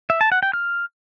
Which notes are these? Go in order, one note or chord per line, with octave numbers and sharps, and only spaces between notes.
E5
A5
F#5
G5
F6